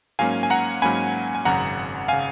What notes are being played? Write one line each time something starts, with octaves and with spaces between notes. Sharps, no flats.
G#2 F#3 A#3 C#4 F5 G#5
G#5
F#5 A#5
G#2 F#3 A#3 C#4 G#5 B5
G#5
G#1 F#2 C#3 F#5 A#5
C#3 F5 G#5